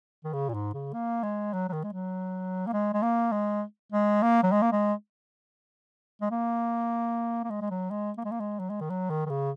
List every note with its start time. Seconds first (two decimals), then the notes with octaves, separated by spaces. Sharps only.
0.24 D#3
0.33 C#3
0.49 A#2
0.54 G#2
0.74 C#3
0.93 A#3
1.23 G#3
1.53 F#3
1.69 F#3
1.73 D#3
1.84 G#3
1.92 F#3
2.67 A#3
2.73 G#3
2.94 G#3
3.03 A#3
3.32 G#3
3.92 G#3
4.23 A#3
4.43 F#3
4.52 G#3
4.62 A#3
4.72 G#3
6.21 G#3
6.31 A#3
7.44 A#3
7.50 G#3
7.61 G#3
7.70 F#3
7.90 G#3
8.17 A#3
8.25 G#3
8.32 A#3
8.40 G#3
8.59 F#3
8.70 G#3
8.81 D#3
8.90 F#3
9.10 D#3
9.26 D#3
9.30 C#3